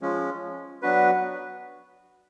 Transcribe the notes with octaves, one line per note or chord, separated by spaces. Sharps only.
F3 G#3 C#4
F#3 B3 D4 F#4 B4